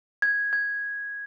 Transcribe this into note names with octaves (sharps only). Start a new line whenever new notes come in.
G#6
G#6